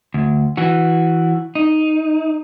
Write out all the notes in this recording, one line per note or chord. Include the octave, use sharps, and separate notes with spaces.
D2
E3 F#4
D#4